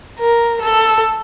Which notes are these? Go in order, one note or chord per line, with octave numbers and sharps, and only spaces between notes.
A#4
A4